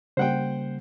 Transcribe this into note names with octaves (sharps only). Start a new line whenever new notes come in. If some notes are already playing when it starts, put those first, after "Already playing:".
C#3 G3 A#3 C5 F#5 G5